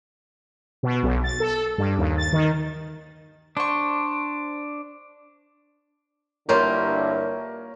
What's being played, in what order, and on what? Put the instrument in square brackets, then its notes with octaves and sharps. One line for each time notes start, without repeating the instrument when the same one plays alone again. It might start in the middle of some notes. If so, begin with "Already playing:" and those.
[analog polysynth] B2
B1
A6
A4
G2
D#2
A6
D#3
[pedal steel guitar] D4 [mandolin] C5 C#6
[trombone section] G2 D3 E4 [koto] A#3 F4 G4 [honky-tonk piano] A#4 C#5